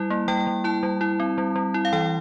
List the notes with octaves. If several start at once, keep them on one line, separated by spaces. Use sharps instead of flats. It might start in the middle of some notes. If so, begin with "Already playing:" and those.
Already playing: G3 E4
A#3
G3 G5
G3
E4 A5
G3
E4
C4
G3
G3
E4
F5
E3 G5